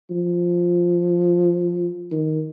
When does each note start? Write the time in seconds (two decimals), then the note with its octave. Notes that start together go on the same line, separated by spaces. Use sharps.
0.11 F3
2.12 D#3